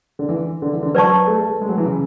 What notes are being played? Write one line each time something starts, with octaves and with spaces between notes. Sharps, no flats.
D3
E3
D3
E3
D3
F#3 B4 D5 A5 C#6
A3
A3
A3
G#3
F#3
E3
C#3